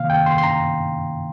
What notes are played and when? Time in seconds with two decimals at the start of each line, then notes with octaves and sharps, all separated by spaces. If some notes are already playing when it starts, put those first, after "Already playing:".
Already playing: C3 D#3 A#3 F5
0.10 G5
0.26 C6
0.38 C6
0.43 A#5